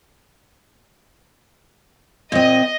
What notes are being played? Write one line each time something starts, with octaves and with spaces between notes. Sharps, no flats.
A#2 C4 D#5